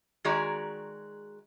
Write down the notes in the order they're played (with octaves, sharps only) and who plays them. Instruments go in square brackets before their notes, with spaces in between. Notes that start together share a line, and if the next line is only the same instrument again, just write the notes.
[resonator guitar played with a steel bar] D#3 G#3 F#4 G#4 D5 A#5